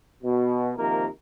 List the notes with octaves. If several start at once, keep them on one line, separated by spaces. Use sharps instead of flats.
B2
C3 D#3 F3 A#3 D#4 A#4